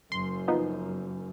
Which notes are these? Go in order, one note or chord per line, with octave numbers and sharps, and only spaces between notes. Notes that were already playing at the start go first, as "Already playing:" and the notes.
F#1 F#2 C6
F3 B3 D#4